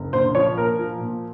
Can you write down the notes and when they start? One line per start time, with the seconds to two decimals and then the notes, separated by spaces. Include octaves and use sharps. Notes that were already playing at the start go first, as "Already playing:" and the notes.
Already playing: F#1
0.13 A#1 C5
0.35 F3 C#5
0.57 A#2 A#4
0.79 F3
1.00 A#2